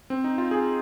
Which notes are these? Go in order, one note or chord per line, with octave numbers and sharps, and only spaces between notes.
C4
D#4
F4
G#4